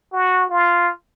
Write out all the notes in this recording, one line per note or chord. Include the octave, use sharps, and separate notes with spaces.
F#4
F4